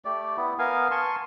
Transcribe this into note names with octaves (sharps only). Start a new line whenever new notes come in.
A3 G4 D5
B3 E4
B3 A#4 F5 G#5
G#5 A5 C6 C#6